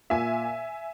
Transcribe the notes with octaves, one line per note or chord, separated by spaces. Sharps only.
A#2 E5 G#5